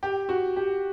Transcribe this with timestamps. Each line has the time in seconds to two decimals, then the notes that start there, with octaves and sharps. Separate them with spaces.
0.03 G4
0.29 F#4
0.56 G4